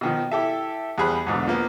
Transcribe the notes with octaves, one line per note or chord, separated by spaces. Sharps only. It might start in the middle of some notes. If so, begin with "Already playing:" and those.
B2 D#3 F3
E4 G4 A4 E5
E2 G3 G#4 C5 B5 F#6
E2 G#2 B2 D3
F3 A#3 B3